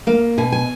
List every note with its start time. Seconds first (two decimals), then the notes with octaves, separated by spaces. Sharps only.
0.07 A#3 F5
0.38 B2 G#5
0.52 G#5